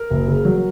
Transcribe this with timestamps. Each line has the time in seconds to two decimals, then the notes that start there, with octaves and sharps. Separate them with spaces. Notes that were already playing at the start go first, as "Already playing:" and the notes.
Already playing: A#4
0.10 F#1
0.27 C#3
0.45 F#3